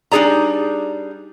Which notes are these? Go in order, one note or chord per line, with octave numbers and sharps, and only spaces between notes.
G3 D4 D#4 G#4 D5 A#5